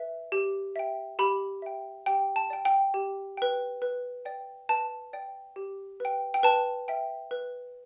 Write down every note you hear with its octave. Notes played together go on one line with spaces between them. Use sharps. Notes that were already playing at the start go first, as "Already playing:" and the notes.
Already playing: B4 E5
G4
E5 G5
G4 B5
E5 G5
G4 G5
A5
D5 G5
G5
G4
B4 G5
B4
D5 G5
B4 A5
D5 G5
G4
B4 G5
G5
B4 A5
E5 G5
B4